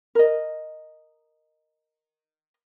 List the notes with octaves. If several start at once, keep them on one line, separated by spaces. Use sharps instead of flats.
A#4 D#5